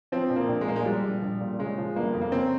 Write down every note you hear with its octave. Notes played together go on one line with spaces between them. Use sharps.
F3 C4
A#1
A#3
A#1
G#3
A#2 A#3
G#3
F3 G3
A#1
A#1
A#2
C#3 G#3
F3
G1 A#3
F2
A#3
C#3 C4